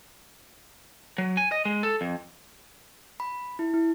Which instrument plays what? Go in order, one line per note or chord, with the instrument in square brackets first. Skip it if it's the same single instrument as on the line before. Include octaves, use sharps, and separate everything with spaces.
[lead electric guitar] F#3
G#5
D#5
G#3
A4
F2
[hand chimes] B5
E4
E4